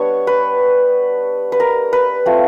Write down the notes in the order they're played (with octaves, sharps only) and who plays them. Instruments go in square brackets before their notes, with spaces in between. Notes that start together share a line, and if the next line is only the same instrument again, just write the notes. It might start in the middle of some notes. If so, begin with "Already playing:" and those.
Already playing: [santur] G3 B3 D4 C#5
B4
B4
A#4
B4
A3 C4 F4